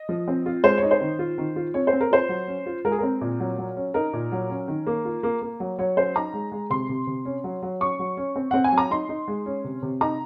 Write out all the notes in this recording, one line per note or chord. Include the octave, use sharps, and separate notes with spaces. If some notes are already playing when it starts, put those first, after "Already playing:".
Already playing: D#5
F3
C4
F4
G#3 C5
C#5
D#4
C5
D#3
F4
D#3
F4
C4 C#5
C5
C4
A#4
F4 C5
F#3
C#4
F4
G#3 A#4
G#4
C4 A#4
A#2
F#3
F#3
C#4
D#4 A#4
A#2
F#3
C#4
D#3
A#3
F4
A#3
A#3
F#3
F#3 C#5
C#4 C5
D#4 A#5
G#3
G#3
C3 C6
C3
C3
C#4
F#3
F#3
C#4 C#6
F#3
C#4
C4
C4 F#5
G#5
F#3
A#5
D#4 C6
D#4
G#3
C#4
C3
C3
D#4 A#5